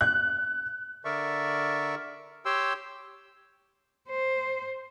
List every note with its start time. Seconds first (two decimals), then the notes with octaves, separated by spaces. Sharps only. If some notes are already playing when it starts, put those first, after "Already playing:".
0.01 F#6
1.05 D3 A#4 D5 E5 C#6
2.45 G4 C#5 G5 C6 E6
4.09 C5